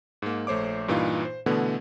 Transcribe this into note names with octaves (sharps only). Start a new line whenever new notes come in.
G#2 A#3
A#1 A3 C5 C#5 D6
G2 A#2 E3 D#4 F4
C5
B2 D3 E3 A3 B3